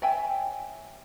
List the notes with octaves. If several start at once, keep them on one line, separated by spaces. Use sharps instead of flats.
C#5 E5 G5 G#5